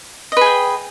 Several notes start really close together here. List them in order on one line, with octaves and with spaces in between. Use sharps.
D#5 B4 G#4 G5